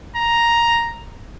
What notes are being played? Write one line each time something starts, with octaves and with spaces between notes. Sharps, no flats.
A#5